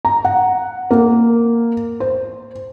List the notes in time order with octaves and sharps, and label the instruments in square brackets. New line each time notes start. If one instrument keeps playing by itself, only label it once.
[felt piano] A#5
F#5
A#3
C5